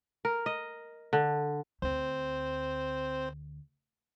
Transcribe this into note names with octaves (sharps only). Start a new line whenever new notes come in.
A#4
D#5
D3
D2 C4 C5